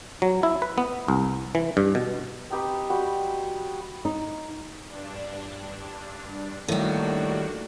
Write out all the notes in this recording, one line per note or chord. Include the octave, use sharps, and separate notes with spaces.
F#3
E4
B4
B3
C2
E3
G2
B2
C4 D#4 G4 B4
G3 F#4 G5 B5
D#4
G2 D4
A2 D#3 G3 A#3 D4 F#4